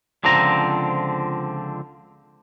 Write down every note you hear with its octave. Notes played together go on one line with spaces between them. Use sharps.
C#2 D3 F3 C4 A#5